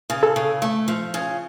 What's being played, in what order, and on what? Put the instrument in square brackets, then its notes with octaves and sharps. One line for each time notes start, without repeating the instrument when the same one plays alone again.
[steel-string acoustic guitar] C#3
[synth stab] A4
[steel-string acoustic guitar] C#3
A3
F3
C#3